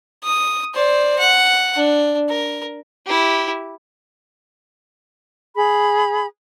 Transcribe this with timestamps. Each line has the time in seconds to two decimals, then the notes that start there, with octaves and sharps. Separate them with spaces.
0.24 D#6
0.74 C5 D5
1.18 F#5
1.76 D4
2.29 A#4
3.06 E4 G4
5.55 G#4 B5